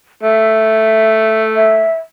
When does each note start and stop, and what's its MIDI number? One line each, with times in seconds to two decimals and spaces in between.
0.23 1.88 57
0.23 1.42 76
1.56 1.94 76